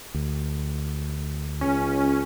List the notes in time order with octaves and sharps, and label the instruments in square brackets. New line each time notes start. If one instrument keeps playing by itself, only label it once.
[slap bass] D2
[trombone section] C#2 [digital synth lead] C#4